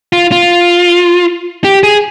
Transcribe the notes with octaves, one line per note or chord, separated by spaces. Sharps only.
F4
F4
G4
G#4